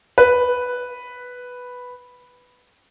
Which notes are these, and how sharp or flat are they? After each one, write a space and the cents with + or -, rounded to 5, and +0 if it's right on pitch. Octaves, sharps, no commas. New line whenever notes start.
B4 +0